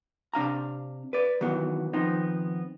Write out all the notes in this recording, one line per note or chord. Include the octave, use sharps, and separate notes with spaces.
C3 D4 F5 A#5
B4 D5
D#3 E3 F#3 B3
D#3 F3 B3 C4 D#4